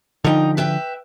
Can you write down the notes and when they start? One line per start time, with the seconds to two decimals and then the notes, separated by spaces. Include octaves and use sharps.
0.24 D3 F3 D#4 G5
0.57 B4 E5 G5